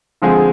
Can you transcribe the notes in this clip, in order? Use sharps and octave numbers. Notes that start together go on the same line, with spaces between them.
D3 F3 G#3 C4 G#4